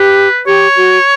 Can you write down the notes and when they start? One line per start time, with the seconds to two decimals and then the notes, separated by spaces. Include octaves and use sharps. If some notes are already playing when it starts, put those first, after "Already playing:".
Already playing: G4 B4
0.46 G4 C#5
0.77 F#4